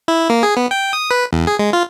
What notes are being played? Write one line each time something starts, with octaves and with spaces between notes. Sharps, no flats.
E4
A#3
G#4
B3
G5
D#6
B4
E2
G#4
G#3
F4